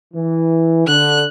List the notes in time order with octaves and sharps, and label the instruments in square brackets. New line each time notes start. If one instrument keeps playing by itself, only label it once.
[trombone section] E3
[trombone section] D3 [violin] F#6